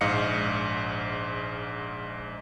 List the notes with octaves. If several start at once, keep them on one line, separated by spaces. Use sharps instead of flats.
A#1 G#2 D#5 F5 C#7